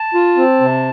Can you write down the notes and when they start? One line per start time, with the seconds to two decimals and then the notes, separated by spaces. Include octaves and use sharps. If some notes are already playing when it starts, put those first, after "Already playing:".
Already playing: A5
0.14 F4
0.37 C4
0.61 C3